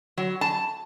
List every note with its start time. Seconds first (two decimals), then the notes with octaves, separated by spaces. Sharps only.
0.17 F#3
0.41 A5